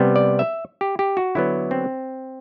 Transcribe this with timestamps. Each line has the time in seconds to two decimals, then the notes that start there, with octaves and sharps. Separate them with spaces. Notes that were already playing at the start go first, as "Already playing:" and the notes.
Already playing: C3 G3 B3
0.16 D5
0.39 E5
0.81 G4
0.99 G4
1.17 F#4
1.35 D3 F#3 B3 E4
1.71 C4